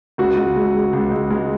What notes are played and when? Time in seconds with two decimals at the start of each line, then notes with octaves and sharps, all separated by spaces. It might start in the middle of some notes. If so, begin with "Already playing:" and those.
0.18 C#2 F#4
0.37 C#2
0.56 G#3
0.75 G#3
0.93 C#2
1.11 C#2
1.31 G#3